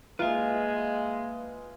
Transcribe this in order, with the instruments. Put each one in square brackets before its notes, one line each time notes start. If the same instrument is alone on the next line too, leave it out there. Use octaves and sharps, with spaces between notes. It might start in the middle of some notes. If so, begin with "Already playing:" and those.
[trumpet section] G#3 [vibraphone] A#3 F5 [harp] F4 [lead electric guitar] B4 E5